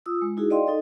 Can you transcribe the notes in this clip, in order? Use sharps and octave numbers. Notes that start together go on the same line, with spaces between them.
F4 D#6 E6
G#3
D#4 E4 F#4 G#4
D5 D#5 F5 G5 C6
D#4 A4 D#5